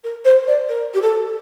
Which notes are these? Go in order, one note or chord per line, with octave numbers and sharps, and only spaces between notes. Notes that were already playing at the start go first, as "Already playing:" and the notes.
A#4
C5
D5
A#4
G4
A4